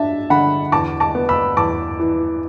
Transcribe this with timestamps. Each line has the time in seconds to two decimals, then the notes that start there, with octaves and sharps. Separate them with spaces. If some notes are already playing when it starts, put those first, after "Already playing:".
Already playing: D4 E5 A5
0.30 D3 F#5 B5
0.72 E2 A5 D6
1.00 A5 D6
1.15 B3
1.29 B5 E6
1.57 E2 A5 D6
1.99 E3